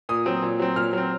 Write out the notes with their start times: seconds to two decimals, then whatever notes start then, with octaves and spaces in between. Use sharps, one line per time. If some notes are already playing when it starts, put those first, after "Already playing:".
0.09 A#2 D#6
0.26 F#3 C4
0.42 A#2
0.59 F#3 C4
0.76 A#2 F6
0.93 F#3 C4